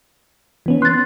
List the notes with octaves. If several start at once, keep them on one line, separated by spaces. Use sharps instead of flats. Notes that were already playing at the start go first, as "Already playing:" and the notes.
E3 B3 C#4
C6 F#6 A6